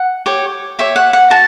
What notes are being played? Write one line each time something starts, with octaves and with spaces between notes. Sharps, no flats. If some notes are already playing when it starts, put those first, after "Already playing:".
Already playing: F#5
G4 C#5
G4 C#5 E5
F#5
F#5
F#4 A5